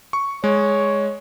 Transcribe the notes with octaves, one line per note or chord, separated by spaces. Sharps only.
C#6
G#3 C#5